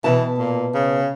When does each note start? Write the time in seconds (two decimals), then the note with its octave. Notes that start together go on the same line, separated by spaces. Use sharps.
0.04 B2 E3 A5
0.38 A#2
0.74 C#3